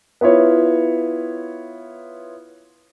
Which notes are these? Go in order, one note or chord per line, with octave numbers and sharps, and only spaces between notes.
B3 E4 F4 C#5